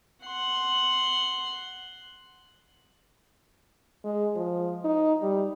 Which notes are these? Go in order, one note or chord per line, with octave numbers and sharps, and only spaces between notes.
F#5 C6
G#3
F3
D#4
G3